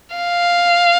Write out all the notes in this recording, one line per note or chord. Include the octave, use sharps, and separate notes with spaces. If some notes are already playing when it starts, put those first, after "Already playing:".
F5